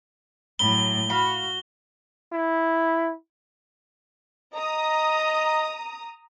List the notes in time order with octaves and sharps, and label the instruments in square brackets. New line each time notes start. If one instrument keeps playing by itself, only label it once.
[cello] A2 F#3 [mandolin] E4 [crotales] G7
[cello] F#4 [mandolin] F5 B5
[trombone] E4
[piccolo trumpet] D#5 [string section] A#5 D#6